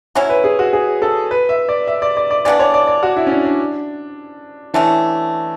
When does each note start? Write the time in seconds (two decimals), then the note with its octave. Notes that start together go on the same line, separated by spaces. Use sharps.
0.15 F#3 C#4 E4 C#5
0.30 B4
0.44 G#4
0.59 F#4
0.73 G#4
1.02 A4
1.31 B4
1.49 E5
1.69 D5
1.87 E5
2.02 D5
2.17 D5
2.31 D5
2.45 C#3 E3 B3 D4 D5
2.59 C#5
2.74 D5
2.87 D5
3.03 F#4
3.17 E4
3.27 C#4
3.31 D4
3.45 D4
4.74 D3 E3 A3 C#4